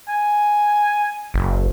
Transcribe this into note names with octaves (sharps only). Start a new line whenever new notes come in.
G#5
F#1